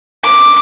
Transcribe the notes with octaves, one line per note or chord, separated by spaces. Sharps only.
D6